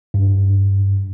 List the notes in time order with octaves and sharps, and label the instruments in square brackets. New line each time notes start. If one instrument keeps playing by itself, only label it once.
[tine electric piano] G2